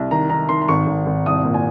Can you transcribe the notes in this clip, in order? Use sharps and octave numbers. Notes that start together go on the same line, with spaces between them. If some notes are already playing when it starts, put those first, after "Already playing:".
Already playing: C2
D#3 A#5
D#3 A#5
D#3 C6
C6
G#1 C#6
G#1
G#1
C2 D#6
A#2
G#5